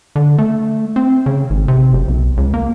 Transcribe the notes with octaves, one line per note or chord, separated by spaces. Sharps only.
D3
A3
C4
C#3
G#1
C3
F#1
B1
C#2
A#3